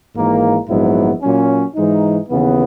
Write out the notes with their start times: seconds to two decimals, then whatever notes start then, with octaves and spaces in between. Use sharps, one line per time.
0.14 G#1 G#2 E3 A#3
0.68 A#1 G#2 F#3 B3 E4
1.22 A#2 F#3 C#4
1.75 G#2 E3 G#3 D#4
2.29 D#2 C#3 E3 B3